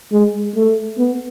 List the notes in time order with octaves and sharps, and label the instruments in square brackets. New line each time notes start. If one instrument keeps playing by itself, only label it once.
[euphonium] G#3
A3
B3